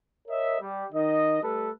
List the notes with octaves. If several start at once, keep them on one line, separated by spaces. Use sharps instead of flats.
A#4 C#5 D#5 E5
G3
D#3 D#5
G3 A3 A4 B4